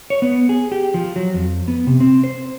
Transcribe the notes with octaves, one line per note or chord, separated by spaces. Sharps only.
C#5
B3
G#4
G4
F3
F#3
F2
B3
C3
C4
C5